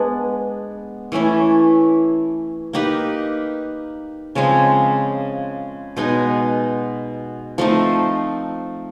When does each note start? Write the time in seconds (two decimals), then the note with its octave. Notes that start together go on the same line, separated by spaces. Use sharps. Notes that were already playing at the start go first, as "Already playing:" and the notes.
Already playing: G#3 B3 D4
1.12 E3 A3 C#4 E4
2.73 A#3 D#4 G4 B4
4.35 C#3 F3 G#3 C4
5.97 B2 G#3 B3 D#4
7.58 F3 A3 C4 D#4